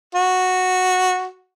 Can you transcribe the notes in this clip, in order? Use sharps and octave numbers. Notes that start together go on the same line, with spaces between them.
F#4